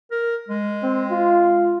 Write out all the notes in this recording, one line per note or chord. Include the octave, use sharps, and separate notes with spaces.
A#4
G#3
C4
F4